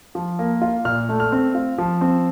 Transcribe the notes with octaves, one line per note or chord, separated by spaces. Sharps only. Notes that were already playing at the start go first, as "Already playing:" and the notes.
F3
A#3
F4
A#2 F6
A3
F6
C4
F4
F3
C4